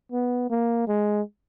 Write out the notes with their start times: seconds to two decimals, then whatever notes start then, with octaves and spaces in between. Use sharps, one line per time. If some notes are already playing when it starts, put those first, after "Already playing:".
0.12 B3
0.50 A#3
0.87 G#3